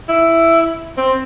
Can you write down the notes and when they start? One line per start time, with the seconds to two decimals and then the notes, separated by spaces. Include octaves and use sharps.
0.09 E4
0.97 C4